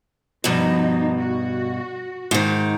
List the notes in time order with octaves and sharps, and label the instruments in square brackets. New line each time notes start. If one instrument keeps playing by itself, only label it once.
[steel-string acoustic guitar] G2 B2 [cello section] F3 D#4
[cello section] F#4
[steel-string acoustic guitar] G#2 D#3